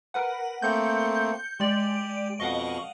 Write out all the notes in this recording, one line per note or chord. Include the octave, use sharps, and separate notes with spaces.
A#4 B4 F#5
A3 A#3 C4 G6 C#7
G#3 G4 D5
F2 B2 D#5 F5 F#5 C#6